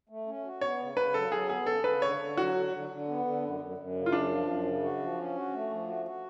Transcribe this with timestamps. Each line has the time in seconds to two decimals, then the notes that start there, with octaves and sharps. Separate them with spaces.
0.09 A3
0.27 C#4
0.44 F#4
0.61 B3 C#5
0.79 C#3
0.97 C#3 B4
1.14 F#3 A4
1.32 F#3 G#4
1.49 B3 G#4
1.66 C#3 A4
1.84 C#3 B4
2.02 D3 C#5
2.20 D3
2.37 F#3 F#4
2.54 D3
2.72 D3
2.89 D3
3.08 B3
3.25 D3
3.42 F#2
3.60 F#2
3.78 F#2
3.95 C#3
4.06 F4
4.12 F#2 D4
4.30 F3
4.47 F#2
4.65 C#3
4.83 F#4
5.00 F3
5.18 C#4
5.35 F#4
5.53 A3
5.71 F3
5.88 F#4
6.06 F#4